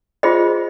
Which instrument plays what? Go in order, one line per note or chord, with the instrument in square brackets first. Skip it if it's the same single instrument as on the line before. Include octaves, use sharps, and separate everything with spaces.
[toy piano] F4 G#4 C5 D#5